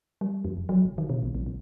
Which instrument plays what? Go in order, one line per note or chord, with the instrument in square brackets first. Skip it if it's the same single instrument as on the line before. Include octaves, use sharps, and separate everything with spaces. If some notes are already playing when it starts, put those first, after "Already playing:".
[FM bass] G3
F2
E1
F#3
F1
D#3
B2
B1
A#1
B1